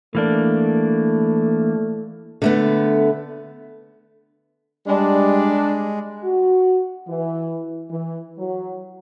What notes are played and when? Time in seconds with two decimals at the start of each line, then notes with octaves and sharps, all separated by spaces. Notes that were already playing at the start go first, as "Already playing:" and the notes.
0.15 E3 A3 A#3 D4
2.42 D3 A3 B3
4.87 G3 G#3 D4
6.24 F#4
7.08 E3
7.90 E3
8.38 F#3